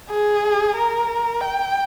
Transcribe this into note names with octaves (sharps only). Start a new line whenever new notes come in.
G#4
A#4
G5